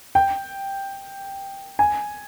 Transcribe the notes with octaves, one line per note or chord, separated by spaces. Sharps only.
G5
G#5